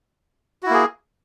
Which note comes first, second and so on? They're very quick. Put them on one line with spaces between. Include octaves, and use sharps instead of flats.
F#4 E4 A#3 G#4